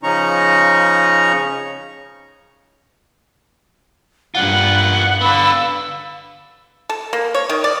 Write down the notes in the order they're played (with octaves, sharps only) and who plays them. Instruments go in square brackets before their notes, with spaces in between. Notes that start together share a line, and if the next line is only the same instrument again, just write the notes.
[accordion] C#3 F3 C#4 D#4 A#5 C#6
[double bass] G2 [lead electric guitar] D4 F4 [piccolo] F#5
[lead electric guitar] D3 B3 [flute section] F5 B5 [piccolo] E6
[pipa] A4
A#3
C#5
D#3
D5